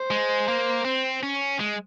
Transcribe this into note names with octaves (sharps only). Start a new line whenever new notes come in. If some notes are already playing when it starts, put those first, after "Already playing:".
Already playing: C5
G#3
A#3
C4
C#4
G#3